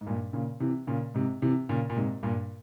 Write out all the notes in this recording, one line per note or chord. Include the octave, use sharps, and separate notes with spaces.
G#2
G2 A#2
A#2 C#3
C3 E3
A#2 C#3
G#2 C3
C3 E3
A#2 C#3
A#2
G#2 C3
G2 A#2